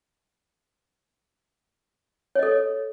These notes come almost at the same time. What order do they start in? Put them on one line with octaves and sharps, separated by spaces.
C#5 D#5 A4